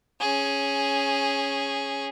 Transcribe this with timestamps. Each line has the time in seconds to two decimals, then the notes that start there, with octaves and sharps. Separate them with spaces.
0.20 C#4 G#4